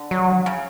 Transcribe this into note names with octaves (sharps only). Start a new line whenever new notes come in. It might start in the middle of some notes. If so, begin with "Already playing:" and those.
Already playing: D3
F#3
C#3